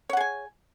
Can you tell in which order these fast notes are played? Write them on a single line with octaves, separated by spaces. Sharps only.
C#5 F#5 G#4 G#5